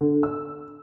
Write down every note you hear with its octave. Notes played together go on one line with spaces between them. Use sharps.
D3
E6